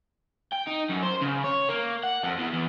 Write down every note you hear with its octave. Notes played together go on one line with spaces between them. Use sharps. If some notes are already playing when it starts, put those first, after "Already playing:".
G5
D#4
F#2
C5
C#3
C#5
A#3
F#5
F2
E2
E2